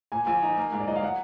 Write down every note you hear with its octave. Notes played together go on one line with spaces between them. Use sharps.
A#2 G#5
A#1 G#5
D#4
A#3
G#2
D5
F#3 D#5
F5
F#3 F#5